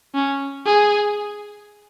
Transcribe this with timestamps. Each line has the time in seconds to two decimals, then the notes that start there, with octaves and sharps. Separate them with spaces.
0.15 C#4
0.66 G#4